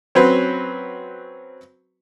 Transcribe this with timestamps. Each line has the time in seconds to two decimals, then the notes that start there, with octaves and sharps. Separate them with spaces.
0.15 F#3 C4 C#4 F#4 B4 C5